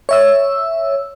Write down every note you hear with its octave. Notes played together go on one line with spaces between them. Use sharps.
C#5 E5 E6